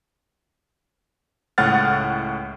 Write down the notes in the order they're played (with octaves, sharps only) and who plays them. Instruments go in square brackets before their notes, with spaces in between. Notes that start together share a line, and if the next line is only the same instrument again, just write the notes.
[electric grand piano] C#2 A2 F#5 F6 A6